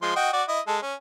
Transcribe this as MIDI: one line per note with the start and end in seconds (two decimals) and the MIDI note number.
0.02 0.12 53
0.02 0.12 56
0.02 0.12 84
0.16 0.29 66
0.16 0.29 75
0.16 0.29 79
0.33 0.43 66
0.33 0.43 74
0.48 0.60 64
0.48 0.60 75
0.67 0.77 56
0.67 0.77 69
0.82 0.94 61